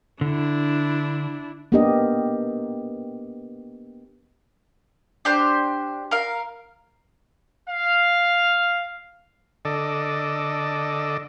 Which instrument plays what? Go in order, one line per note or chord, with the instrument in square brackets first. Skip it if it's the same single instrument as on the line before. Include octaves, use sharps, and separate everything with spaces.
[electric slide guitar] D3 [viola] D4 E4
[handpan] A#3 B3 D4 G4 A#4 D#5
[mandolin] D4 G4 C5
A#4 F5
[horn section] F5
[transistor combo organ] D3 A4 D5 D#5